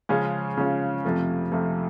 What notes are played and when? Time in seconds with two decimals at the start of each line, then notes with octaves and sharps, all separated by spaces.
0.09 C#3 F3 G#3 C#4 F4
0.57 C#3 F3 G#3 C#4 F4
1.05 F2 C3 F3 A3
1.52 F2 C3 F3 A3